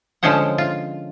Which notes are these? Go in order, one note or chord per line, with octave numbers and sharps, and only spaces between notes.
D3 F3 G#3 C#4 C5 F#5
F4